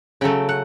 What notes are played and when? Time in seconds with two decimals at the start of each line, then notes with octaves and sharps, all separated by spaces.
0.21 C#3 F#3 A3 G5
0.49 F#5